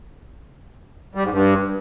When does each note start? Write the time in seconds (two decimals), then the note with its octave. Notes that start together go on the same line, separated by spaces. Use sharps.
1.15 G3
1.24 G#2
1.33 G2